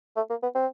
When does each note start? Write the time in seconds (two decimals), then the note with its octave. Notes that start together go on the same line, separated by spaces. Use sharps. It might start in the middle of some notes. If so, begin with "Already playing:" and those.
0.16 A3
0.30 A#3
0.43 B3
0.55 C4